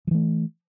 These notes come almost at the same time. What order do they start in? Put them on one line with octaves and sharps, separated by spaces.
F3 E3 A3